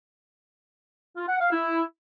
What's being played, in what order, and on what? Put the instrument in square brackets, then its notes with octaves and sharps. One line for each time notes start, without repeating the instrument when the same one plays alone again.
[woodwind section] F4
F#5
F5
E4